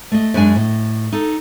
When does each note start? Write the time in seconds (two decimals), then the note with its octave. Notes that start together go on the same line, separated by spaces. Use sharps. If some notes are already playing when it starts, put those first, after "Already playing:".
0.12 A3 D#5
0.34 F#2 G#3 D4 G#5
0.56 A2 D#5
1.12 D#4 A4